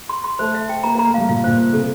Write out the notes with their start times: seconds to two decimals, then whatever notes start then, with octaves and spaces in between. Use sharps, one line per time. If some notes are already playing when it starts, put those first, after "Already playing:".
0.09 C6
0.24 C6
0.39 A3 C5
0.54 E5
0.69 G5
0.84 A#3 A#5
0.95 A#3
0.99 A#5
1.06 A3
1.14 G3 F5
1.29 A#2 F5
1.44 A#2 C5
1.58 C5
1.73 C3 A4